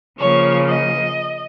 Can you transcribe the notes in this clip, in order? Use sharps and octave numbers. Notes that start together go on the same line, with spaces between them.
C#3 F3 A#3 C#5
D#5